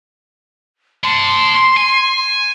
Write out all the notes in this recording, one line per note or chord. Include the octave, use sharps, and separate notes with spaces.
C#5 A5 C6
G#5